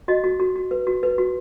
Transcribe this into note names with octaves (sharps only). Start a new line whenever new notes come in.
F#4 D#5
F#4
F#4
F#4
B4
F#4
B4
F#4